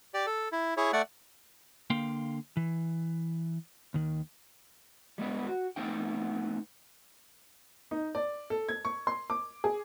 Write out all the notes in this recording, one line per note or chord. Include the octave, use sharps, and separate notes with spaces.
G4 D5
A4
E4
E4 G#4 C#5
A3 D5 F#5
D3 A#3 F5 G5 C6
E3
D#2 D#3
G3 G#3 B3 G4 B4
F#4
A3 B3 C4 D#4 G5
D#4
D5
A4
G#6
C#6
C6
D6
G#4